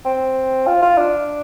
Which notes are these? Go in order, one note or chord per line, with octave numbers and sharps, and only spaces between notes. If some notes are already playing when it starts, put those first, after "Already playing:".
C4
F4
F4
D4